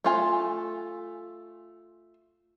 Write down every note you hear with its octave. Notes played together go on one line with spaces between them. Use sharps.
A3 F4 G#5